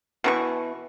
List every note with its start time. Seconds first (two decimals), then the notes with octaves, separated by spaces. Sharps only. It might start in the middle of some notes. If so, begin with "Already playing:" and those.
0.24 B2 E3 C#6